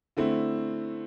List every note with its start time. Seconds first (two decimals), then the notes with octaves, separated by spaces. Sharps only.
0.17 D3 A3 C4 E4